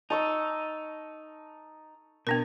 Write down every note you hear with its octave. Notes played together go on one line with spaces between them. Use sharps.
D#4 A5 C#6 E6
B2 B3 D4 A#4